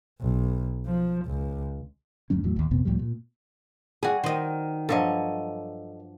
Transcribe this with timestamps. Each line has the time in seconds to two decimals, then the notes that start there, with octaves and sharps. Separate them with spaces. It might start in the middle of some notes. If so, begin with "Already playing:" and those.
0.21 B1
0.86 F3
1.26 C#2
2.30 D2 G2 F#3 C#4
2.44 E2 A2 F#3
2.56 G#1 D#2
2.71 A#1 F2 C3 B3
2.85 C#2 A2 F3 G3
2.99 A#2
4.03 G3 F#4 G#4
4.24 D#3 C5 D#5
4.89 G2 F3 F#3 A4 C#5 D#5